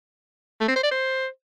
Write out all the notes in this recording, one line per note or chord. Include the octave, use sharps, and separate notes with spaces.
A3
C4
C5
D5
C5